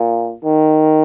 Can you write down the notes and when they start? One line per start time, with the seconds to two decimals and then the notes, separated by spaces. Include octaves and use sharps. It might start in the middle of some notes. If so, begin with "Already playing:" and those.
Already playing: A#2
0.44 D#3